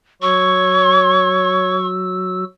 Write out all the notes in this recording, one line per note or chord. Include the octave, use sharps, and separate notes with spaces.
F#3 F#4 C#5 C#6 E6